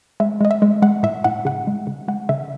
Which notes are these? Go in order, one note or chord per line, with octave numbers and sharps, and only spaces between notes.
G#3 E5
G#3 D#5
E5
G#3
G#3 F#5
A2 E5
A2 F#5
C#3 F#5
G#3
C#3
G#3 F#5
C#3 E5